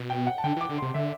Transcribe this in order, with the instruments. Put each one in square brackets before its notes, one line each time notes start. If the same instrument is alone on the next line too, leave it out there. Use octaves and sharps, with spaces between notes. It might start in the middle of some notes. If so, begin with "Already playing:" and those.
Already playing: [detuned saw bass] B2
[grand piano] G5
F#5
A5
[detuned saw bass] D3 [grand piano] G5
[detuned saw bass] E3
[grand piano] D6
[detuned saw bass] D3
[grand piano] C6
[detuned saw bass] C3
[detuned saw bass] D3 [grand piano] E5